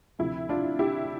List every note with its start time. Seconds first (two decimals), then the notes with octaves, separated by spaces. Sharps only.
0.19 D2 C3 F3 E4
0.49 D4 F4
0.79 E4 G4